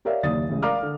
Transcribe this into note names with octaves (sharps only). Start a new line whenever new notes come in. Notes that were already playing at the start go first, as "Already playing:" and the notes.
G4 A#4 C#5 D5 E5 F5
F#1 D#2 D5 D#6 A6
A1 C#3 G#3
A#4 D5 F5 A#5 D6 F6
D3